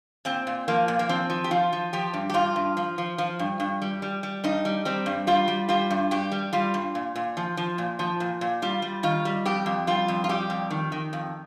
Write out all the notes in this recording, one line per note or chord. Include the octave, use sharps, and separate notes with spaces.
A#2 C4
A#2
F3 A#3
A#2
A#3
F3 C4
F3
G4
F3 F4
F3
F3 G4
G2
G4
G2 F4
G2
F3
F3
F3
G2
G2
G3
G3
G3
G2 D#4
G3
G3 C4
G2
G3 F4
G3
G3 F4
G2
G2 G4
G3
G3 F4
G2
A#2
A#2
F3
F3
A#2
F3
A#2
A#2
G3 F4
G3
D#3 F4
G3
F2 G4
F2
G3 F4
F2
F4
G3 G4
F2
D#3
D#3
F2